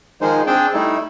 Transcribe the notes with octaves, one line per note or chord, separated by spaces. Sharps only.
D#3 F3 G#3 D#4 G#4 C5
C4 D4 G#4 G5 A5
G3 A3 D#4 E4